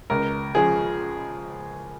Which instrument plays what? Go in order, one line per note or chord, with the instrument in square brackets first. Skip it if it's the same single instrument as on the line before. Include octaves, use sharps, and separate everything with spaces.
[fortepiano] C#2 A#4
C#3 F3 G#3 G#4